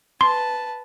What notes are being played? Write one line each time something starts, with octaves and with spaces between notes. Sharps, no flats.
B4 A5 C6